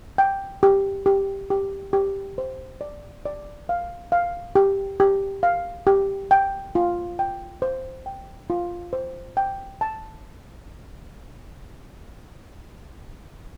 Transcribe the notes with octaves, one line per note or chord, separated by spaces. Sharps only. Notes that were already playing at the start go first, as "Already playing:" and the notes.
G5
G4
G4
G4
G4
C5
D5
D5
F5
F5
G4
G4
F5
G4
G5
F4
G5
C5
G5
F4
C5
G5
A5